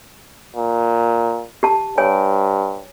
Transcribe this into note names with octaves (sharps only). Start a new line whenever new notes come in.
A#2
G4 A5
G2 C#5 G#5